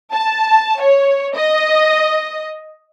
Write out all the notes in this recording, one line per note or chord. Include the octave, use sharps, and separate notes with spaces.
A5
C#5
D#5